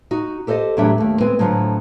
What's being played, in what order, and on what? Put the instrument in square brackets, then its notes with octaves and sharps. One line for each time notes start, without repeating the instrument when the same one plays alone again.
[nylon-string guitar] D#4 F#4
G4 A4 C5 D5 D#5
E2 A2 F#3 D4 G4 E5
D#2 A3
G#3 B3 C4 B4 G#5
A2 D3 F3 F#3 G#3